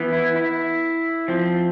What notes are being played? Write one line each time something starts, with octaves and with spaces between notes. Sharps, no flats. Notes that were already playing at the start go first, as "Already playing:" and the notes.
Already playing: E3 B3
E4
E4
F3 C4